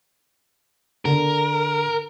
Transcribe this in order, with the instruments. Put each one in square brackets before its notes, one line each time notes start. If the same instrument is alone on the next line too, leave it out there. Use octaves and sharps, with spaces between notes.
[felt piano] D3 [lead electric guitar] A#4